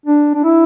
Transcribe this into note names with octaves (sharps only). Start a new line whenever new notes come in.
D4
D4
E4